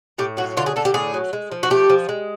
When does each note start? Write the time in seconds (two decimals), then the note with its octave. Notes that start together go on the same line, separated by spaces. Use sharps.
0.18 A2 G4
0.37 F#3 F#4
0.57 D3 F4
0.66 G#4
0.76 D3 A4
0.85 G4
0.94 A2 G#4
1.14 F#3
1.33 G#3
1.52 F3
1.63 F#4
1.70 A3 G4
1.90 F3
2.09 G#3